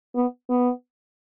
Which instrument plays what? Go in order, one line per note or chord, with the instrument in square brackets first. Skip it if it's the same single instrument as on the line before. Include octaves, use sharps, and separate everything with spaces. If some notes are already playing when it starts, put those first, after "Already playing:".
[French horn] B3
B3